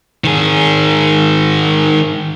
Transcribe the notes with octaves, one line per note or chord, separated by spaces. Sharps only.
D#3 G#4